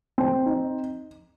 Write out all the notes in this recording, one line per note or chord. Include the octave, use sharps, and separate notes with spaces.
C4
D#4